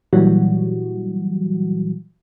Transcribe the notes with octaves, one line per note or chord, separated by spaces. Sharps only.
A#2 E3 F#3 G3 F#4